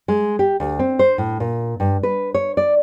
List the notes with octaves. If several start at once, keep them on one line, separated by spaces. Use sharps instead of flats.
G#3
G4
D2
C4
C5
A2
A#2
G2
B4
C#5
D5